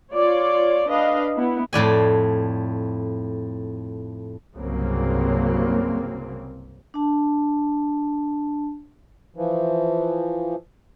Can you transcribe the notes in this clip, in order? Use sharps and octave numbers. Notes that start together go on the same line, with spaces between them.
F4 C#5 D5
D4 B4 D#5 F5
B3 E4
F2 A2 D5 G#5
C2 G2 C#3 F#3 A#3 C4
D4 A5
E3 F3